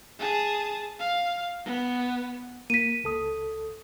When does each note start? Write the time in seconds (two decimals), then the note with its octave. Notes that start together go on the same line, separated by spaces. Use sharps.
0.19 G#4 A5
1.00 F5
1.66 B3
2.70 A#3 B6 D#7
3.04 C#2 A4 D#6